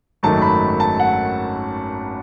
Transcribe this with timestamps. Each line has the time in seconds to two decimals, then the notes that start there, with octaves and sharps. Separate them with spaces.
0.23 G#1 F#2 D#3 F#3 A3 A5
0.42 B5
0.80 A5
1.00 F#5